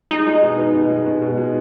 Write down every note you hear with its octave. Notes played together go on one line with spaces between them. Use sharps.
G#3 D#4
G#3
B2
B3
B2
G#3
B2
B2
G#3